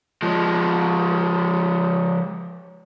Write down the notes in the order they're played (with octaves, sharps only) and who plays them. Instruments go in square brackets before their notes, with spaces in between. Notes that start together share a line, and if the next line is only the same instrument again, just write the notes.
[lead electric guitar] F3 G#3